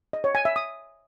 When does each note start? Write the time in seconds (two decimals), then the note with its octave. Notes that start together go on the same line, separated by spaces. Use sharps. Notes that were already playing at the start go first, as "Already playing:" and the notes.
0.13 D#5
0.24 C#5
0.35 G#5
0.45 E5
0.56 D#6